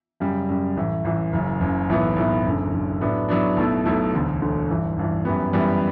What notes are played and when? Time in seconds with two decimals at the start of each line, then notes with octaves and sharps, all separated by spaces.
0.20 F#2 C#3 G3
0.49 F#2 C#3 G3
0.76 A1 A2 E3
1.05 A1 A2 E3
1.33 F#1 F#2 C#3
1.60 F#1 F#2 C#3
1.89 B1 A2 E3 B3
2.16 B1 A2 E3 B3
2.45 F#1 F#2 D3
2.73 F#1 F#2 D3
3.01 A2 F#3 B3 D4
3.29 A2 F#3 B3 D4
3.56 B1 B2 A3 E4
3.85 B1 B2 A3 E4
4.14 E1 D2 D3
4.41 E1 D2 D3
4.69 A1 G2 E3
4.97 A1 G2 E3
5.25 F#2 E3 G3 B3
5.53 F#2 E3 G3 B3